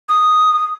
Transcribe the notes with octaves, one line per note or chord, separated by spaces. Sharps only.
D#6